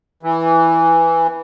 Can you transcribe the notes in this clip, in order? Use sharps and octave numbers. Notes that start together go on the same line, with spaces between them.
E3